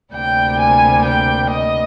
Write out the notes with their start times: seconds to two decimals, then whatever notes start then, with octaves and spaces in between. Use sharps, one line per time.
0.13 D2 C3 G3 A#3 G5
0.59 G#5
1.04 G5
1.49 D#5